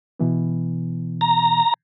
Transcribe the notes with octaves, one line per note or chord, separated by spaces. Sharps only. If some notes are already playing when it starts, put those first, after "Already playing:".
B2 E3 B3
A#5